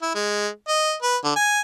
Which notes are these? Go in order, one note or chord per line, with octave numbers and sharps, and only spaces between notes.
E4
G#3
D#5
B4
D3
G#5